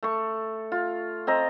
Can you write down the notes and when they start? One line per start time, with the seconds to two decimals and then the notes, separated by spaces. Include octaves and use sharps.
0.03 A3 C#6
0.72 F4
1.27 C4 D#5 A#5